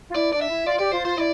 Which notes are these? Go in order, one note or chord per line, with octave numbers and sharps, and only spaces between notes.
F4
E4 D5
D4 D5
E5
E4
F4 D5
G4 D5
F4 C5
F4 C5
E4 D5